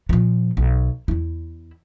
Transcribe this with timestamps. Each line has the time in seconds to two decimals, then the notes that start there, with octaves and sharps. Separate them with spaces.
0.09 A#2 F3
0.57 B1
1.08 E2 E4